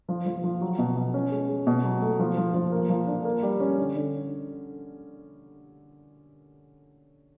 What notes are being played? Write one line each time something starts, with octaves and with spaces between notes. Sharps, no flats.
F3
F3
F3
F#3
B2
B2
C#4
G#3
G#3
B2
F#3
A3
F3
F3
F3
A#3
F3
D4
A#3
G3
C#4
D3
D3